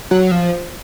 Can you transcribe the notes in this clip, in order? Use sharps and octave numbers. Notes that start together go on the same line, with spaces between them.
F#3
F3